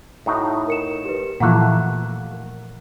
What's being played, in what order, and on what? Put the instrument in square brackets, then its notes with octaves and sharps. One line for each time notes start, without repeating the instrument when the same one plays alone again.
[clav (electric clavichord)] A2 D#4 F#4
[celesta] A#4 C#7 E7
G4 B4
[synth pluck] A#2 E3 F3 [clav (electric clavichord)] A3 A#3 [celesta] F#5 F#6